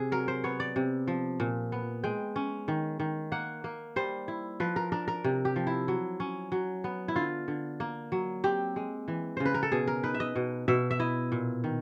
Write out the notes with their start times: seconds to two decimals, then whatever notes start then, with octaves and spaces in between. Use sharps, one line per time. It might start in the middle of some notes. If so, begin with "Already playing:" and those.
Already playing: C3 G#4
0.12 F#3 A#4
0.28 C5
0.44 B3 C#5
0.60 D5
0.76 C3
1.07 F3
1.40 A#2
1.72 B3
2.04 G#3 G5
2.36 C#4
2.68 D#3
3.00 D#3
3.32 A#3 F#5
3.64 A#3
3.96 G3 C5
4.28 E4
4.60 F3 B4
4.76 A#4
4.92 D4 A#4
5.08 A#4
5.24 C3
5.45 G4
5.56 F3
5.67 E4
5.88 F#3
6.20 C#4
6.52 F#3
6.84 B3
7.08 E4
7.16 D3 F4
7.48 D3
7.80 A#3
8.12 F#3
8.44 C4 G4
8.76 G#3
9.08 E3
9.37 C#3 C5
9.45 B4
9.54 A#4
9.63 A4
9.72 B2 G#4
9.87 A#4
10.03 D#4 B4
10.14 E5
10.20 D#5
10.36 B2
10.68 B2 E5
10.91 E5
10.99 E4 D#5
11.32 A#2
11.64 D#3